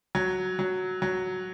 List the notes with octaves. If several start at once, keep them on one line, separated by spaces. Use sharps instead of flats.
F#3
F#3
F#3